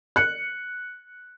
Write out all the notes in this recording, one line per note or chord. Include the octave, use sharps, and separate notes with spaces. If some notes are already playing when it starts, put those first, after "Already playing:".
F#6 C#7